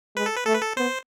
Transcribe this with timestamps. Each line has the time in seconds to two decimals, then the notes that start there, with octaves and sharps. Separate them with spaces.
0.16 G#3 B4
0.26 A4
0.36 B4
0.46 A3 A4
0.54 B4
0.62 A4
0.77 B3 C5